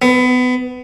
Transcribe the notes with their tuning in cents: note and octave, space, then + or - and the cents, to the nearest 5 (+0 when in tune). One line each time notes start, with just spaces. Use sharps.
B3 +25